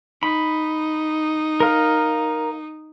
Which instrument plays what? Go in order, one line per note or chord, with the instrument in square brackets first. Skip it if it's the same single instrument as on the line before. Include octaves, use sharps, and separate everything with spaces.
[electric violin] D#4 [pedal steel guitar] B5
[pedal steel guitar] A#4 F5